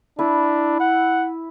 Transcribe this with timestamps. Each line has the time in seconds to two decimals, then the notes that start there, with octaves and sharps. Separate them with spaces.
0.19 D4 E4 B4
0.80 F#5